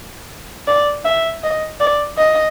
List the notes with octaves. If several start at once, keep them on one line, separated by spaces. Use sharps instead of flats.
D5
E5
D#5
D5
D#5